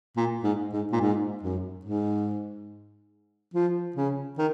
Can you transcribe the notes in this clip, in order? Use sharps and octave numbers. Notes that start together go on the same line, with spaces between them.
A#2
G#2
G#2
A#2
G#2
F#2
G#2
F3
C#3
D#3